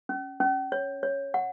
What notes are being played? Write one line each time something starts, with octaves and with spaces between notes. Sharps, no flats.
C#4
C#4
C#5
C#5
F#5